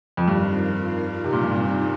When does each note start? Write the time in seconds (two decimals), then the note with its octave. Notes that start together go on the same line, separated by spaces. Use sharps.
0.17 F2
0.27 G2 D#3 C4 F4 A#4 F5
1.24 C3 G3 C4 D#4 A#4
1.32 A#2
1.42 G2
1.51 A#2